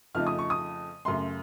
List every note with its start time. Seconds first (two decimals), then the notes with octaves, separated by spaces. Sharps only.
0.15 F2 C#3 F3 A3 D#4 F6
0.27 D#6
0.39 C#6
0.50 D#6
1.05 F#2 C#3 A3 C6